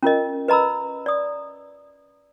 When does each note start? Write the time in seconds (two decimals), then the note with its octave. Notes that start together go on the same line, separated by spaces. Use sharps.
0.03 C#4 F4 A#4 D#5
0.48 B4 D#5 A#5 B5 E6
1.06 D5 D#6